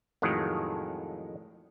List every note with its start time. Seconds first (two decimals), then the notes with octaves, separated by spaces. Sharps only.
0.22 F2 A2 D#3 F#3 G#3